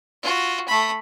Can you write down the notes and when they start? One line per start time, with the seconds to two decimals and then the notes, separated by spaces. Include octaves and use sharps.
0.23 F4 F#4
0.68 A3 B5